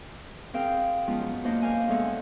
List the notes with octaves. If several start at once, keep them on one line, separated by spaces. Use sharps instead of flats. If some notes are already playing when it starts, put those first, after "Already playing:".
C4 G#4 A#4 F5 G5
F3 G#3 B3 C#4 F4
F#2
A#3 D4 C5 D#5 F#5
A#4 C5 F5 G#5
E2 G#3 A4 C#5 F#5